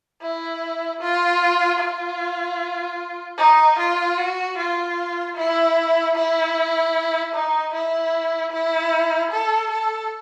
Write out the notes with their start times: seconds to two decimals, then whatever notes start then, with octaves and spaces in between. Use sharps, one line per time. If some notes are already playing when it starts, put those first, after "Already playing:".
0.22 E4
1.01 F4
1.80 F4
3.38 D#4
3.79 F4
4.18 F#4
4.58 F4
5.37 E4
6.16 E4
7.33 D#4
7.74 E4
8.52 E4
9.31 A4
9.71 A4